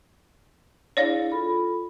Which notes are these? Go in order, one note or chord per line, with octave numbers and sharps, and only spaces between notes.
D4 E4 G#4 C#5 D5 F5
F4 A4 B5